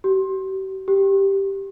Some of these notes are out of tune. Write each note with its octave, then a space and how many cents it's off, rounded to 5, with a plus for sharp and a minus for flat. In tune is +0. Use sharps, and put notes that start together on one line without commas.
G4 -40
G4 +0